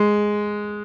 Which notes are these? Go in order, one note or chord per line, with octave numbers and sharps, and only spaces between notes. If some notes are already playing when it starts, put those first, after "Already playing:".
Already playing: G#3